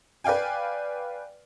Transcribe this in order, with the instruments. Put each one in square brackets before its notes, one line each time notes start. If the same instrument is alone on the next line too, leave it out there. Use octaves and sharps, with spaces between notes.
[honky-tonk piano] B4 D5 F5 G5 G#5